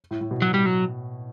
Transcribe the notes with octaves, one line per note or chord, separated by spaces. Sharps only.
A2
A2
B2
F#3
G3
F#3